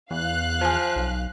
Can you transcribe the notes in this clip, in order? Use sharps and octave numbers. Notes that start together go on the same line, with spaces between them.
E2 F5 F#6
F3 C5 G#5
B1